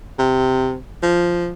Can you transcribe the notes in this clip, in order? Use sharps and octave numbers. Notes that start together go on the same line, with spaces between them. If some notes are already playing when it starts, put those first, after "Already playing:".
C3
F3